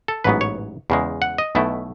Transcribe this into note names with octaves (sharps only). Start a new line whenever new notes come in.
A4
A1 G#2 F#3 B3 B4
C#5
E2 C#3 G#3
F#5
D#5
B1 B2 A3 E4